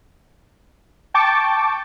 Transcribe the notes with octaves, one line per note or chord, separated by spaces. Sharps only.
G5 A5 C#6 D6 A6